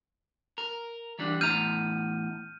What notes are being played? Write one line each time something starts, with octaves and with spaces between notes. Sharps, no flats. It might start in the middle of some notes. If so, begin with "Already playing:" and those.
A#4
E3 G3 D4
E2 A2 A#5 F6 G6 D#7